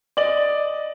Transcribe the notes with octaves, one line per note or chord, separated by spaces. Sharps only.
D5 D#5 F#7